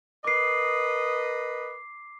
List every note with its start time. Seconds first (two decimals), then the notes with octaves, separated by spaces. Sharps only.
0.25 A#4 B4 D#5 D6 C7